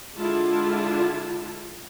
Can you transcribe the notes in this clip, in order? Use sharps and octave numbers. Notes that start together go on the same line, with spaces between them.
D3 G#3 D4 E4 F4 A5